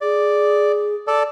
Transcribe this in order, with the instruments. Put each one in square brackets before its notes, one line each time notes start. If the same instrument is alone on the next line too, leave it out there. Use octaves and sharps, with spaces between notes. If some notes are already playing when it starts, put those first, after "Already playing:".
[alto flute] G#4 [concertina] D5
[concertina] A4 D5